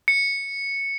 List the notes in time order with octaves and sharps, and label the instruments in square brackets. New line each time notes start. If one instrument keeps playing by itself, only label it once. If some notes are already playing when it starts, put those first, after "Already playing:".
[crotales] C#7